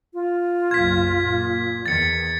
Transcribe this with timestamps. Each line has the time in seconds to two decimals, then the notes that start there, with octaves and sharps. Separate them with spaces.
0.14 F4
0.71 F#1 B1 G#6 B6
1.21 A#2
1.86 E2 D#3 A6 C#7